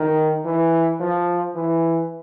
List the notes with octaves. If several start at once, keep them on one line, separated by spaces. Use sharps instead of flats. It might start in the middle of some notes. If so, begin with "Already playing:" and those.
Already playing: D#3
E3
F3
E3